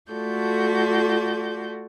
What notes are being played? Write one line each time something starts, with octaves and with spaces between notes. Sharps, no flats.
A3 F4 F#4 A4 D5 G6